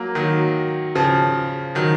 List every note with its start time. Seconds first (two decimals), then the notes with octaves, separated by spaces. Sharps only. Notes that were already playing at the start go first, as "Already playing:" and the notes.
Already playing: F#3 A#3
0.15 D#3 F#3
0.95 C#3 F3
1.75 D#3 F#3